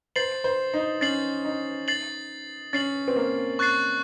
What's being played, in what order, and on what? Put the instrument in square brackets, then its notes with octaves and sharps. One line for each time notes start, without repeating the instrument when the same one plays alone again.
[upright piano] C5 [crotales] A6 C7 F#7
[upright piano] C5
D#4
[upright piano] C#4 [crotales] A6 C7 F#7
[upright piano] D#4
[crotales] A6 C7 F#7
[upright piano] C#4 [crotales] A6 C7 F#7
[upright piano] C4
A#3
[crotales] C#6 F#6 A6 C7